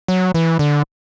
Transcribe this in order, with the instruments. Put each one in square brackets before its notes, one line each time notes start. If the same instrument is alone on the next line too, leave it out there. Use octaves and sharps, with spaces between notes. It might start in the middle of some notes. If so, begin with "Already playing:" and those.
[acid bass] F#3
E3
D3